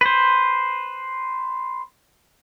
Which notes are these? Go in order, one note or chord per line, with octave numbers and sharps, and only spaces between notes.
B4 C5